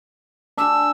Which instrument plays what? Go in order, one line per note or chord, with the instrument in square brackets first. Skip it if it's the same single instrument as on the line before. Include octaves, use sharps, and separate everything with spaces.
[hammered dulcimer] D4 G#4 [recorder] E6